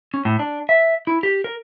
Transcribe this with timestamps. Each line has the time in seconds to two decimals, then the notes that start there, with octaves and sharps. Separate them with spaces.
0.14 C#4
0.25 A2
0.39 D4
0.69 E5
1.07 E4
1.23 G4
1.44 A#4